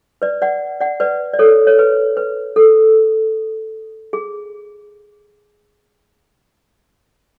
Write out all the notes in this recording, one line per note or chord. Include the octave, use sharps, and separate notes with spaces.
B4 D5
D5 F#5
D5 F#5
B4 D5
D5
A4 C#5
C#5
B4
B4
A4
G#4